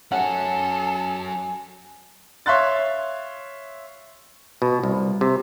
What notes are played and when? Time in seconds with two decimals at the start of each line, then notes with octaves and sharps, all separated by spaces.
0.12 F#3 C#4 A4 F#5 G#5
2.46 C#5 E5 F5 C6 F#6 A6
4.62 B2
4.84 C2
5.21 C3